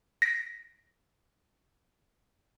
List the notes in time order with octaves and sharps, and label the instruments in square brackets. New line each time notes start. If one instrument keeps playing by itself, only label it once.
[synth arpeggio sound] A#6 B6 D7